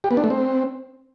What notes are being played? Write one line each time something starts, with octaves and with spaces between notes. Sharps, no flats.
G4
B3
D4
A3
C4